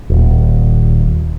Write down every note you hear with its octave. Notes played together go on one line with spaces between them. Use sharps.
D#1